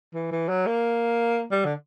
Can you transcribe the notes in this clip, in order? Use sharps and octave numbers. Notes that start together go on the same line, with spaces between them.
E3
E3
F#3
A#3
G3
D3